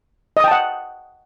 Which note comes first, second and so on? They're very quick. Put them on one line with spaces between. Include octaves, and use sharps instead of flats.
D#5 D#6 G5 A5 F#5